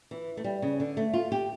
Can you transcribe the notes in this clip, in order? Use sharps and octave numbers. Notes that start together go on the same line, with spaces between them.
E3
A3
G3
C#3
D3
A3
F4
G4